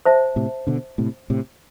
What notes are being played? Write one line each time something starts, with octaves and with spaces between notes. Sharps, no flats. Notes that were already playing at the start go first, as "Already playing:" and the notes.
C5 E5 A5
A2 C3
B2 D3
A2 C3
A2 C3